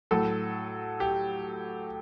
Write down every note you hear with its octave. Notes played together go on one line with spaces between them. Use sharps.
A2 F#3 A4
G4